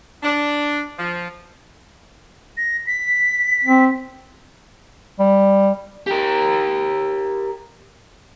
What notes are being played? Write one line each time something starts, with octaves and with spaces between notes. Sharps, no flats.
D4
F3
A#6
B6
C4
G3
G4 A#4